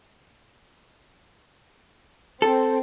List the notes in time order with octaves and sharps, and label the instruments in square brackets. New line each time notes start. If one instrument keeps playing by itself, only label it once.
[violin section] C4 [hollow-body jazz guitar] A4